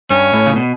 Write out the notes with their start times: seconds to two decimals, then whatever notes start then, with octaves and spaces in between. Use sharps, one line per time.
0.10 G2 C#4
0.33 A2
0.46 C#3
0.56 B2